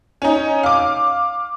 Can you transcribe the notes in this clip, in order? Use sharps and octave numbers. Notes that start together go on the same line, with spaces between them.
C#4 D#4
F5 D6